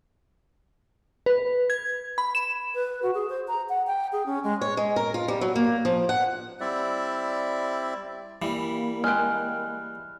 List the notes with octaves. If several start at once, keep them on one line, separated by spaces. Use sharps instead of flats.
B4
G#6
B5
E7
B4
F#4
G#4
C5
A#5
F#5
G5
G#4
C#4
G#3
C#5
G#3
A#4
F4
G3
F#3
A#3
F3
F#5
G3 C4 E4 D5 E5
E3 G3 A#3
G#3 G5 F6 F#6